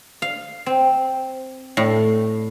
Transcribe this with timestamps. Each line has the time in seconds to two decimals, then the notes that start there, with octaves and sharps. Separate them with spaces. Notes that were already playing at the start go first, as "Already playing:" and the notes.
0.22 F5
0.66 C4
1.77 A2